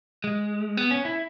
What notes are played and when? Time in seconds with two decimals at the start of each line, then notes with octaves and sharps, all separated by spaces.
0.24 G#3
0.77 B3
0.91 C#4
1.05 E4